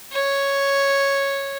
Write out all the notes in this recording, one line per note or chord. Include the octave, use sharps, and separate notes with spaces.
C#5